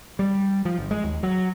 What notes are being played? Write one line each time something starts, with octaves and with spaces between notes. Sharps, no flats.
G3
F3
G1
G#3
D#2
F#3